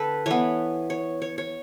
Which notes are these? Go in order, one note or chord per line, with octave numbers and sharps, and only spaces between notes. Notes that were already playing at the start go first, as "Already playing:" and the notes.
Already playing: D3 A4 B4 G5
E3 B3 C#5
C#5
C#5
C#5